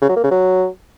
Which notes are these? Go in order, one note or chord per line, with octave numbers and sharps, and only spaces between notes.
C#3
F#3
A#3
C#3
F#3